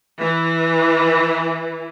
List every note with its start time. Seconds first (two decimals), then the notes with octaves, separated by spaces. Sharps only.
0.22 E3